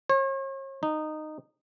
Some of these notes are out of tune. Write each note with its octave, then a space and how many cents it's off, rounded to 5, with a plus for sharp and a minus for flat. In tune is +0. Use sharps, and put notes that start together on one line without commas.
C#5 -40
D#4 -15